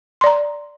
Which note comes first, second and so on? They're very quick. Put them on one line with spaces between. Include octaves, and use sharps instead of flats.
C6 D5 A#5